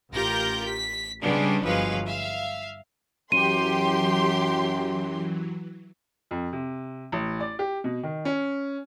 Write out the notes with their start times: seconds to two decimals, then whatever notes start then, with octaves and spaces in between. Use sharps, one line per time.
0.12 A1 F4 G4 A#4 G6 A#6
0.66 B6
1.24 C#3 G3 G#3 B3 C#4 D4
1.64 G1 F3 F#3 G#3 B4 F5
2.08 E5 F5
3.32 F#2 E3 F#3 G4 C6 D#7
6.31 F2
6.53 C3
7.12 A1
7.40 D5
7.59 G4
7.84 B2
8.03 D#3
8.25 C#4